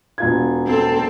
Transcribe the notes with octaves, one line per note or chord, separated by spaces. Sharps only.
E1 F4 G#6
C4 A4